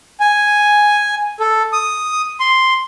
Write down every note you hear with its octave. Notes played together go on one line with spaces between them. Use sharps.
G#5
A4
D#6
C6